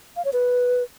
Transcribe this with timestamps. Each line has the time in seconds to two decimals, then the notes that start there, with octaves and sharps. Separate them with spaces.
0.16 F5
0.25 C#5
0.33 B4